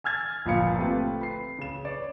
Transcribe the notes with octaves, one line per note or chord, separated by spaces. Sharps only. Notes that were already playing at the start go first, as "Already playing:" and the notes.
G#5 E6 F6 G#6 A6
G1 A#2 F3 F5 B5 C#7
A3 C4 F4 G4 B4
B5 C7
C#3 E7
B4 C#5 D5